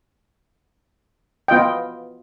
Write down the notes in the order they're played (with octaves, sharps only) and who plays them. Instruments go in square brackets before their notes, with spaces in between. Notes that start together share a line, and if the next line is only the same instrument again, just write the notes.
[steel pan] B3 F4 D#5 G5